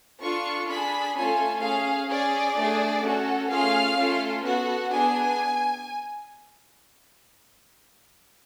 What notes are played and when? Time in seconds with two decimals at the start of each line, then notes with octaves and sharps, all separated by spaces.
0.22 D4 F4 A4 C#6
0.69 D4 G#4 B5
1.15 A3 C#4 F4 A4 G#5
1.62 C#4 G#4 F5
2.10 C#4 G#4 D5
2.56 A3 D4 G#4
3.03 C#4 F#4 A4
3.50 A3 C#4 F4 G#4 F5
3.97 A3 C#4 F4 A4
4.44 B3 F#4 A4 F#5
4.91 B3 D4 G#4 G#5